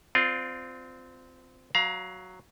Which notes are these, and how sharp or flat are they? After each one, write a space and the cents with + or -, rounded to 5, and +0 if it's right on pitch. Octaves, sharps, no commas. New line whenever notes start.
C4 -20 F4 +5 D5 +0
F#3 +0 F5 +0 A#5 +40